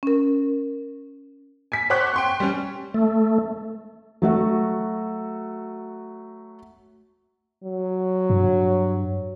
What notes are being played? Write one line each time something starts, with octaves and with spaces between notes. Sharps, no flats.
C#4 A#4
G#5 B6
C5 C#5 F#5 C6 D6 F#6
G5 C6 C#6
G3 C#4
A3
F#3 A3 F#4
F#3
G2